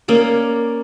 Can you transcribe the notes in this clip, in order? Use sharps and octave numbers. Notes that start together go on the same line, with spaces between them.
A#3 C#4 D5